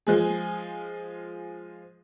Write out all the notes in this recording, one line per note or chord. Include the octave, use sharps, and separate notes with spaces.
F3 G#3 G#4